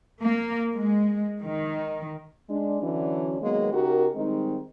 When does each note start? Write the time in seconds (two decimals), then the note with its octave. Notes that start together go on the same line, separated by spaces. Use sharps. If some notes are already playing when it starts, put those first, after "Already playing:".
0.22 A#3
0.73 G#3
1.41 D#3
2.50 G#3 D4
2.82 D3 E3 F#3 C#4 D4
3.42 D#3 F#3 G#3 A#3 B3
3.73 C#3 D#4 F#4 G4 A#4
4.15 D#3 G3 G#3 C4 D#4